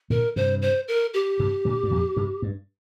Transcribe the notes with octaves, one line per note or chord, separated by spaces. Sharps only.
A#2 D3 A#4
G2 C3 C5
C5
A#4
G4
G2 C3
A#2 D3
G2
F2 A#2
G2 C3
G2